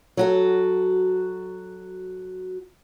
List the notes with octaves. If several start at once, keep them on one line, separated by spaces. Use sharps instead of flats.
F#3 F#4 A4